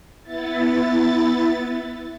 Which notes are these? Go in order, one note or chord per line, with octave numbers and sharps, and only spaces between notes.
B3 E4 A6